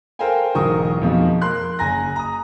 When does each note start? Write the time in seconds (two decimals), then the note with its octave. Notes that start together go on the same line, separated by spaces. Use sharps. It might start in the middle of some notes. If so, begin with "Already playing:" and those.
0.19 A4 A#4 C5 F5 G5 G#5
0.55 E1 G#2 F#3 A#4 C#6 D#6
1.01 F2 B2 F3 G#3 A#3 D#4
1.42 A#4 C6 F#6
1.79 F#1 G#5 A#5 A#6
2.16 A#5 D#6